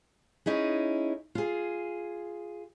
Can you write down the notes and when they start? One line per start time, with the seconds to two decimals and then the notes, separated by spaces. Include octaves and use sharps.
0.46 C#4 D#4 E4 G#4
1.35 F4 G#4